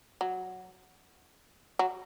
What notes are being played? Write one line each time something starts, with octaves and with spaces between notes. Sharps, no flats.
F#3
F#3